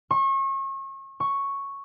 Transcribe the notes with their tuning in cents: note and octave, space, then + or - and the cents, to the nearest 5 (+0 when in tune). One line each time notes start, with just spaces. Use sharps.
C#6 -35
C#6 +0